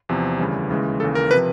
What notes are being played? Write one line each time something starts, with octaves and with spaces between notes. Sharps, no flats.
E2 C3 F3
D2 C#3 E3 G3
D#2 C#3 E3 G#3
D#2 C#3 E3 A4
A#4
C3 F3 B4